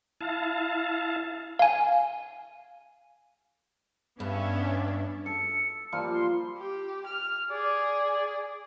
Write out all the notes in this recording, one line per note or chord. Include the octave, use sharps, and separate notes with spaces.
E4 F5 A5
F5 G#5
G2 B3 C#4 D4 E5
A4 C#7
F3 G3 A#3 F6
C6
G4
F6
G#4 D5